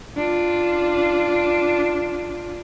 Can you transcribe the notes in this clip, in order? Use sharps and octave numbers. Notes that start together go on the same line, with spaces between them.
D4 F4